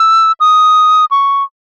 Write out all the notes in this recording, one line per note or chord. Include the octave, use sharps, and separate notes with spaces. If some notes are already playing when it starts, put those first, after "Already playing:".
Already playing: E6
D#6
C#6